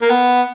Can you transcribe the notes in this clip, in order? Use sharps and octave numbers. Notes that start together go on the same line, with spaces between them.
A#3
B3